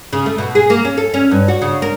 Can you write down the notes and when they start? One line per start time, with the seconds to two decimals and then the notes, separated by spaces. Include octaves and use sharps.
0.13 C#3
0.26 A3
0.38 B2
0.55 G#4
0.70 A#3
0.85 C#4
0.97 A4
1.14 C#4
1.31 G2
1.48 F#4
1.62 C#3
1.82 A#4